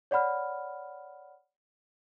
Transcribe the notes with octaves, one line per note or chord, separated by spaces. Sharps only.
C#5 D5 F#5 B5 F6